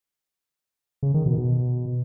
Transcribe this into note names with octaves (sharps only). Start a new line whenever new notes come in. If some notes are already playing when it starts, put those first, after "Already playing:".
C#3
D#3
B2
B2